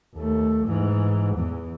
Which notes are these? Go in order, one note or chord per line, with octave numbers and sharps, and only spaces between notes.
D#2 A3
G#2 E3
E2 E3